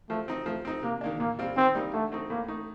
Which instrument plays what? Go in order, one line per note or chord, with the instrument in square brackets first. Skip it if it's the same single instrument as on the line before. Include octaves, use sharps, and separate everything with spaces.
[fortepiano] F3 [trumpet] A3
[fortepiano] C4 D#4
[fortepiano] F3 [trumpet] A3
[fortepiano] C4 D#4
[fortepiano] C3 [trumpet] A#3
[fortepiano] D#3 A#3 D4
[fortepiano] A#2 [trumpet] A#3
[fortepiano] G3 C4 F4
[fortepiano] D#3 [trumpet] C4
[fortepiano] G3 A#3 D#4
[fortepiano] D3 [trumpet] A3
[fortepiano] A3 C4 D#4
[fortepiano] A2 [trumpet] A#3
[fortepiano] A3 D#4